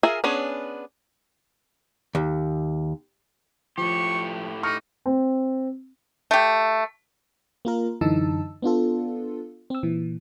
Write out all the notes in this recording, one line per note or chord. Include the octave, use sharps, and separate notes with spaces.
F4 G#4 A#4 E5 G#5
B3 C#4 D4 G#4 C#5
D#2
A2 F3 G4 C#6
D#4 C#6 F6
C4
A3 G4
A#3 F4 A#4
F#2 D3 E3 D#4 A5 E6
B3 D4 F4 A4
C4 E6
A#2 E3